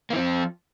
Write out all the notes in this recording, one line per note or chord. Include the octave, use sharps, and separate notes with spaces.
E3 F3 A#3 C4